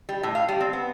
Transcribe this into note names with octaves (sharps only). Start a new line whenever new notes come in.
G3
A2
F5
G3
C4
B3